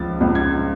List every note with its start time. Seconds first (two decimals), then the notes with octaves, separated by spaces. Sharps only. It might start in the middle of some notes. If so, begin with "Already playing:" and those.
Already playing: C#2 F3 A6
0.21 C#2
0.35 G#6